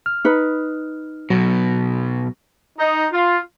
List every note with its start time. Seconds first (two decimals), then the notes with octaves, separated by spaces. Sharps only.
0.06 F6
0.25 D#4 B4
1.30 B1 B2 F#3
2.78 D#4
3.12 F4